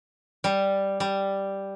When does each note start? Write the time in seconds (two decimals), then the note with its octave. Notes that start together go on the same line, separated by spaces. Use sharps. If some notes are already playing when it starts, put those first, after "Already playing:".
0.44 G3
1.00 G3